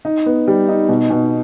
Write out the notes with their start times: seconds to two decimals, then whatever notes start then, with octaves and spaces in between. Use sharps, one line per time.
0.05 D#4
0.26 B3
0.48 G3
0.69 D#4
0.89 B2
1.10 B2